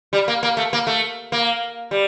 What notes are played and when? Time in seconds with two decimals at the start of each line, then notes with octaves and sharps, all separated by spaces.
0.13 G3
0.28 A#3
0.43 A#3
0.57 A3
0.73 A#3
0.87 A3
1.32 A#3
1.91 G3